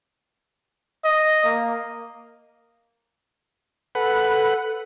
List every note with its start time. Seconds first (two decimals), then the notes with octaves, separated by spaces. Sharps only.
1.05 D#5
1.44 A#3
3.95 A4 B4 F#5